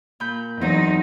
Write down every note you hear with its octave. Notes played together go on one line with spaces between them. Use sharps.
A#2 B5 G6
E2 F#3 C4 D#4